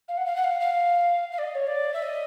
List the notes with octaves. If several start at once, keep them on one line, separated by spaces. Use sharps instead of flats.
F5
F#5
F5
F#5
F5
F5
F5
D5
D#5
C#5
D5
E5
D#5